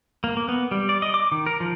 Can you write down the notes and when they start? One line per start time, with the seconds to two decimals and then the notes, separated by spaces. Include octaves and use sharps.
0.24 A#3
0.37 A#3
0.49 B3
0.71 G3
0.89 D5
1.02 D#5
1.14 D6
1.32 D#3
1.46 A#4
1.60 F3